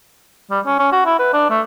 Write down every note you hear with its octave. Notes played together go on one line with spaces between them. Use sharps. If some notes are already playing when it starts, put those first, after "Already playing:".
G3
C#4
C#4
F#4
E4
B4
D4
A3